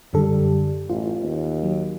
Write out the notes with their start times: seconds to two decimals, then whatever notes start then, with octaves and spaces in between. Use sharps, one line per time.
0.14 F#2 D3 G3 A4
0.90 A1 F4
1.23 D#2
1.63 F#3